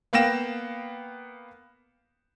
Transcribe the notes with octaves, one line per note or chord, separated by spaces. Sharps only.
A#3 B3 F5 G5 A#6 E7